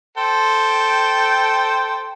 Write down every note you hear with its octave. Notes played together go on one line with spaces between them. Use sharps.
A4 C5 G5